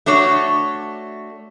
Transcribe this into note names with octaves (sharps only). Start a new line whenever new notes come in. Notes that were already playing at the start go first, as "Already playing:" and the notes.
A3 D4 F#4 C#5